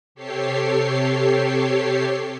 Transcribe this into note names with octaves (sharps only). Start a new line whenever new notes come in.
C3 G4 A4 C#5 C7